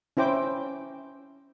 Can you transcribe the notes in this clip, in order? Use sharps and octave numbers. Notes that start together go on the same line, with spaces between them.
C#4 E4 C5 G5 D6